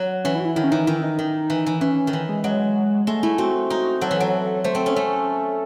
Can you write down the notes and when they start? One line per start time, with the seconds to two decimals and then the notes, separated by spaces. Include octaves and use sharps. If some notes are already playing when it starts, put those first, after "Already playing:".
Already playing: F#3
0.24 E3 C#4
0.35 E4
0.40 F#4
0.45 E4
0.56 D#3 E4
0.64 C#4
0.71 E3 D#4
0.87 D#3 E4
1.03 D#4
1.19 D#3
1.50 E3
1.66 E3
1.81 E3 C#4
2.07 D#3
2.13 E3
2.29 G#3
2.44 F#3 G#3
3.07 G#3 A3
3.23 A3 E4
3.38 C4 F#4
3.70 D#4
4.01 F#3 A4
4.11 E3
4.20 F#3
4.64 A3 C5
4.75 C4 A4
4.86 C#4 A4
4.96 A3 A4